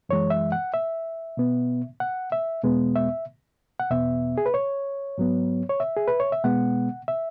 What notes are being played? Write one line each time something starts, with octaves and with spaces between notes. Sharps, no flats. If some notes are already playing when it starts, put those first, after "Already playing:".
F#2 E3 G#3 C#5
E5
F#5
E5
B2 B3
F#5
E5
E2 B2 G#3 B3
E5
F#5
E2 B2 B3 E5
G#4
B4
C#5
G#2 F#3 B3
C#5
E5
G#4
B4
C#5
E5
B2 G#3 B3 F#5
E5